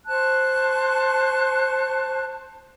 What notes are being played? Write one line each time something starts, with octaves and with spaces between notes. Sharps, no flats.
C5 A5 C#6 F#6